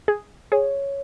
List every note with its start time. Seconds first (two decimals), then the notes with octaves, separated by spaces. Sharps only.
0.08 G#4
0.52 G#4 C#5